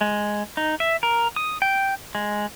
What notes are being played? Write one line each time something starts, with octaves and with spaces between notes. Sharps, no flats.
G#3
D#4
E5
A#4
D#6
G5
G#3